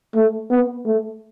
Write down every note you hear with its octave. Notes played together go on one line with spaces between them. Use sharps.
A3
B3
A3